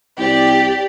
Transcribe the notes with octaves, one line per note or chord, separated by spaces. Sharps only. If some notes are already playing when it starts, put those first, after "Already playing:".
C2 G4 D5